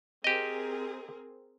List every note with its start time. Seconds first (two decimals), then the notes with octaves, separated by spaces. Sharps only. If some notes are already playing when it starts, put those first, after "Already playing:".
0.24 C4 G4 G#4 A#4 D#5